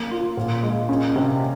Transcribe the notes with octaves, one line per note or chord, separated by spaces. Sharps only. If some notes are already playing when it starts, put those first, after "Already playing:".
Already playing: A#3
F4
A#2
G#3
C#4
C3